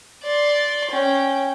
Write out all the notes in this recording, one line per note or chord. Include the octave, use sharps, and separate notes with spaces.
D5 C6
C#4 G5